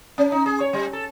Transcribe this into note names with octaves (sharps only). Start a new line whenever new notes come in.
C#4
D#4
G#4
C#5
G3
A4